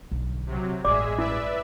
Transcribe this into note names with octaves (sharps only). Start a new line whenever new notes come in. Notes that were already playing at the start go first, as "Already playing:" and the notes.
B1 D3
C3 F#3
A1 G2 G#3 G#4 D5 E5 D6
E4 B4 D5 E5